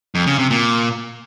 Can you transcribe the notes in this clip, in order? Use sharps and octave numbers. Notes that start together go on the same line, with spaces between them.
F2
C#3
C3
A#2